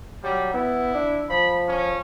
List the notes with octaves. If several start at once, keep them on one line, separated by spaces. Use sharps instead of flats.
F#3 G3
B3 E4
D4
F3 B5
C#4